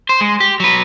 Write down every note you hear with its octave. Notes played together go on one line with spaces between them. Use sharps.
C5
G#3
G4
F#3 B4